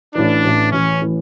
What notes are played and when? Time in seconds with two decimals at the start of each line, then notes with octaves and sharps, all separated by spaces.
0.15 A1 A2 E3 D4
0.44 A1 A2 E3
0.72 A1 A2 E3 C#4
1.02 A2 E3